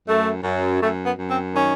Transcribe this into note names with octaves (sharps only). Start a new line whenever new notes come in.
F#2 A3
F#2
F#2 A3
B3
F#2
C4
D#3 C#4